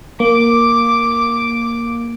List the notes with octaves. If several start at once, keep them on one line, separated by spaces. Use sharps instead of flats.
A#3 D6